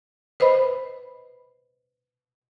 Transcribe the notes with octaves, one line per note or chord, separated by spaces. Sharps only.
B4 C5 D#5 B5